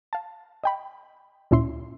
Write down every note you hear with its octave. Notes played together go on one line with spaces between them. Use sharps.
F5 A5
D#5 G5 B5
D2 A#2 C#4 E4 E5 C6